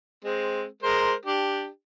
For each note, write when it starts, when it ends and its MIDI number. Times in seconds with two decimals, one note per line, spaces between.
0.24 0.64 56
0.24 0.64 60
0.83 1.14 56
0.83 1.14 70
0.83 1.14 72
1.25 1.67 62
1.25 1.67 67